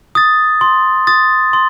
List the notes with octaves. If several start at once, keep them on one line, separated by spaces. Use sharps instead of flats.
D#6 A6
C6
D#6 A6
C6